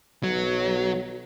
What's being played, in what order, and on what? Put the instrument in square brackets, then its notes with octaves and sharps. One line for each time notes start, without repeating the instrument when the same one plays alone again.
[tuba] B1 [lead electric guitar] F#3